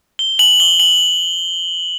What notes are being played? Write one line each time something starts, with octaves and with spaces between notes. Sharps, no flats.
G7
F#7
G7
F#7